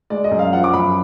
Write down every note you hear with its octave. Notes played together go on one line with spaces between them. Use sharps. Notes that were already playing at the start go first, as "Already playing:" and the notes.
G#3 D5
D#5
F#2
F5
F3 F#5
D6
F#2 B5